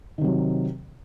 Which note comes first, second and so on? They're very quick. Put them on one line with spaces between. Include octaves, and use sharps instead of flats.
D#3 C3 F#3